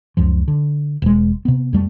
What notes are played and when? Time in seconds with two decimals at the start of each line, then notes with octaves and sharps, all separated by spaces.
0.17 C#2 F#2 F3
0.48 D3
1.02 E1 G#3
1.45 C3 B3
1.73 F2 G3 A3